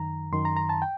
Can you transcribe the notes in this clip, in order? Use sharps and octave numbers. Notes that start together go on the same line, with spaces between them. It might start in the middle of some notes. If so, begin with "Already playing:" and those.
Already playing: F#2 D#3 A#5
F#2 D#3 C6
A#5
A#5
A5
G5